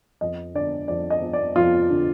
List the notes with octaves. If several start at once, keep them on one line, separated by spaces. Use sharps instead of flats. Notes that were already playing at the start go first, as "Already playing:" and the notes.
F2 D#5
D3 D5
F2 D5
D#5
F3
D5
F2 F4
D3